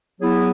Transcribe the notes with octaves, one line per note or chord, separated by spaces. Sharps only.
F#3 B3 E4 G#4